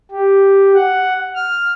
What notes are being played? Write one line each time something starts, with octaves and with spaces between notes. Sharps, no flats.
G4
F#5
F6